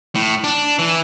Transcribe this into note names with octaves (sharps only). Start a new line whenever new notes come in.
A2
D4
E3